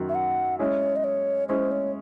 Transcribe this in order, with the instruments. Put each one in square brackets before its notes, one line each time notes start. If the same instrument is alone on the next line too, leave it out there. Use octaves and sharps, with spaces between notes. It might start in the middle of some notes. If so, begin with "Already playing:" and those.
Already playing: [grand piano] F#2 D#3 F#3
[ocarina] E5
F#5
[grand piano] G#3 C#4 E4 G#4 [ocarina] C#5
[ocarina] D#5
C#5
[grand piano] G#3 C#4 E4 G#4 [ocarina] C5
[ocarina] C#5